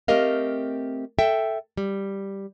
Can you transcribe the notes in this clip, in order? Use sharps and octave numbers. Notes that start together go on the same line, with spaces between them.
A3 C4 G4 A#4 D#5 F5
A4 E5 G5
G3